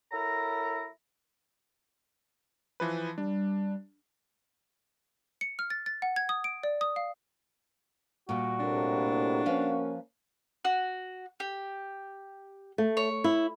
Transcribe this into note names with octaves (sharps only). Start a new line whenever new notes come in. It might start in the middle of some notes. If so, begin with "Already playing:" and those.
F#3 E4 A4 A#4 A#5
E3 F3 B4
G3 D4
C#7
F6
A6
A6
F#5
G#6
D#6
D7
D5
D#6
F5
A#2 G3 F#4
A2 C3 A#3 D4
F3 A#3 C#4 B4 F5
F#4
G4
A3
C#5
E4